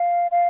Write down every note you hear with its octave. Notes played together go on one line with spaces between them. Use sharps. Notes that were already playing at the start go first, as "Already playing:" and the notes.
Already playing: F5
F5